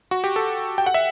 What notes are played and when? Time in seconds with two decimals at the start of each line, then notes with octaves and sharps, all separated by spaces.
0.11 F#4
0.24 G4
0.36 A4
0.78 G5
0.86 F#5
0.94 E5